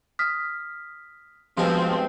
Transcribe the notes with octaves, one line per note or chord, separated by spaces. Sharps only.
D#6 F6 B6
G2 B2 F3 G#3 C4